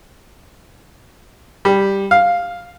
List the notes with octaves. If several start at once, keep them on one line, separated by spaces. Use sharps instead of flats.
G3
F5